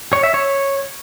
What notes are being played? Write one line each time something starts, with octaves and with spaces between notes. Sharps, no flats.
C#5
E5
C#5